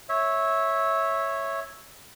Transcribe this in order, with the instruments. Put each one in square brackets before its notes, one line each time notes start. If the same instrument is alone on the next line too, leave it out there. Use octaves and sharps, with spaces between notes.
[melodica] C#5 E5